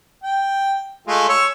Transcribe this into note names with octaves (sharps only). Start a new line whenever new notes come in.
G5
G#3 A3 F4
C#5 C#6 E6